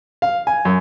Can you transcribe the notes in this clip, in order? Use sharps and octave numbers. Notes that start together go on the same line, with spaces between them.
F5
G#5
F#2